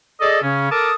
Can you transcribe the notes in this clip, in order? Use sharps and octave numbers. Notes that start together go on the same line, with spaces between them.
G#4 A4 D5 D#5
C#3 C#4
A4 A#4 A5 D6 D#6